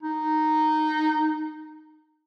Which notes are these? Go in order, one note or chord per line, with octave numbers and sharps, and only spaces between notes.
D#4